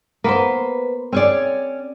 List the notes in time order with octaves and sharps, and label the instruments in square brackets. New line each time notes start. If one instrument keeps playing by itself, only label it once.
[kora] A#3 B3 [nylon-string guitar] B4 C5
[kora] C4 G#4 [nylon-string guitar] C#4 C#5 D5